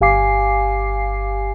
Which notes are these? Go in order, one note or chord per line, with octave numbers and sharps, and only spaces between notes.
G1 G4 F5 G#5 D6 C7